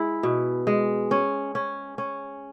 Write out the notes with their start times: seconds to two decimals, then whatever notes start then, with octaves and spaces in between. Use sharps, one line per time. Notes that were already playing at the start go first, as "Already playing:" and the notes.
Already playing: G#3 E4
0.23 B2
0.67 G#3
1.11 C#4
1.55 C#4
1.98 C#4